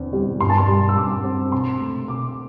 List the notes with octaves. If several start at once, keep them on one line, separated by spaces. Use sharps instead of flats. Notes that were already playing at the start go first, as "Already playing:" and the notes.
Already playing: E2 D3 C4
G3
G2 C6
A5
C6
G3
E6
G2 D6
C4
C3 C6
A3
C3 D6